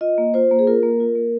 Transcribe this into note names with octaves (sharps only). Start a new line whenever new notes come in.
F4 D#5
A#3
F4 C5
A#3
G#4
F4 A#4
A#3
F4
A#3